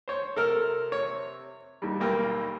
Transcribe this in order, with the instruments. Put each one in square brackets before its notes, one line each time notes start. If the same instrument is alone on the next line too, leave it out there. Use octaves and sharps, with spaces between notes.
[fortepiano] C5 C#5
[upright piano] C3 [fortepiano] A4 A#4 F6
[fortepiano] C#5
[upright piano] D#2 G3
[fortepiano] B1 A#3 G5